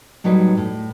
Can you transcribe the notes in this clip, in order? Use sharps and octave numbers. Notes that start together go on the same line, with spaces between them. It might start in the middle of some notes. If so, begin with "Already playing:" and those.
A2 F#3 G3 D#4 B4
A2